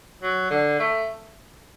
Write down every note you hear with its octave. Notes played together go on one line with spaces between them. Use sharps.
F#3
D3
A3